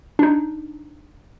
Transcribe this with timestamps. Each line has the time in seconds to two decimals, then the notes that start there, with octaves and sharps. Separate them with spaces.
0.19 D4 D#4